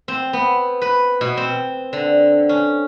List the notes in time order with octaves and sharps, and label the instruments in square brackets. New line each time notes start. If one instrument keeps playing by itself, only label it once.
[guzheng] C4
B3
B4
B2
C4
D3
C#4